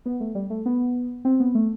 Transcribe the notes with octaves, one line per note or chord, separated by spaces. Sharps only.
B3
A3
G3
A3
B3
C4
B3
A3